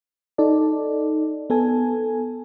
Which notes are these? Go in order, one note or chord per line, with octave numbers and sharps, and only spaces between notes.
D#4 A4 D5
B3 A4 G#5